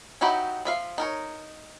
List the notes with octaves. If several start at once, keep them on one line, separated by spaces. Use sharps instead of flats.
F#3 D#4 E4 F#4 G4
F3 E5 F5
D#4 A#4 C#5